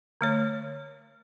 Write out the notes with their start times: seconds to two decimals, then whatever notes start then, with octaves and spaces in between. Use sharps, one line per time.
0.21 D3 A3 C#5